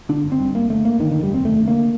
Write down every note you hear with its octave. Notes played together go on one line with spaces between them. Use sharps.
D3 D4
G1
C4
G2
G1 A#3
D3 A3
G1 A#3
D3 D#3
D#3
F1
G3
D#2 C4
F1 A3
D3
A#3